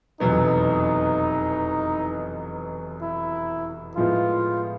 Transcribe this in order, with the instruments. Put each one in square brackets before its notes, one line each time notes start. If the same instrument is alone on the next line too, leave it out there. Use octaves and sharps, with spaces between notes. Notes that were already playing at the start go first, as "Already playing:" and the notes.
[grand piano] F1 E2 B2 F#3 B3 [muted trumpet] D#4
[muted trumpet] E4
[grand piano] A2 F3 G#3 B3 E4 [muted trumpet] F4